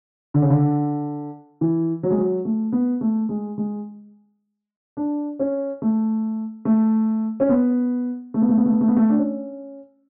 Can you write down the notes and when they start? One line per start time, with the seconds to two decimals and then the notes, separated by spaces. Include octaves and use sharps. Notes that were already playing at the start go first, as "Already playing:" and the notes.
0.34 D3
0.42 C#3
0.50 D3
1.61 E3
2.03 F#3
2.10 G#3
2.18 F#3
2.45 A3
2.72 B3
3.01 A3
3.29 G#3
3.58 G#3
4.97 D4
5.40 C#4
5.82 A3
6.65 A3
7.40 C#4
7.49 B3
8.34 A3
8.41 B3
8.49 A3
8.58 B3
8.65 A3
8.72 B3
8.81 A3
8.88 B3
8.96 A3
9.10 D4
9.18 C#4